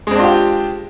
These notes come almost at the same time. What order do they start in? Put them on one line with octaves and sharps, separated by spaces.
G#3 C4 D4 F4 G4